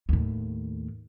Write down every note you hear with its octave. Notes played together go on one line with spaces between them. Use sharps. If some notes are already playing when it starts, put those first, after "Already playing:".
D#2 A2